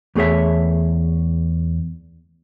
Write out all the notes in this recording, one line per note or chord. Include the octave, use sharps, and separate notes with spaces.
E2 A3 G#4 C#5 E5